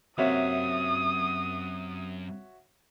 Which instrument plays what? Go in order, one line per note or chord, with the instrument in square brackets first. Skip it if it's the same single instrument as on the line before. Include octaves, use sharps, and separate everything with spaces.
[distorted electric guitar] F#2 [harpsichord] C3 A#3 [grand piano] F#4 C#5 E5 [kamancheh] D#6